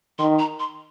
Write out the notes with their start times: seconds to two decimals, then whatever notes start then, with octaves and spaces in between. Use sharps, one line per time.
0.19 D#3 C6
0.39 A#5
0.59 C6